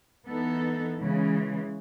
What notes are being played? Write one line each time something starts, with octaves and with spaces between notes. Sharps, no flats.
E3 B3 D#4 A4
C#3 E3 G#3